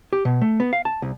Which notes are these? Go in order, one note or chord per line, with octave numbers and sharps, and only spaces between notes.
G4
B2
A3
B3
F5
A5
C2